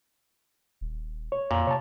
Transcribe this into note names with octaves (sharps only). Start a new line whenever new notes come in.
D#1
C#5
F2 A#2
C3 C#5 A5